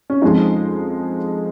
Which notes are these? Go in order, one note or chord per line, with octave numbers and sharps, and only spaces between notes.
C#4
F2 F3 G#3 D#4